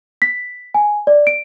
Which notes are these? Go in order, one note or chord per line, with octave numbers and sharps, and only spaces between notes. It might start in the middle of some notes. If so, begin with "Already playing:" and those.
B6
G#5
D5
D7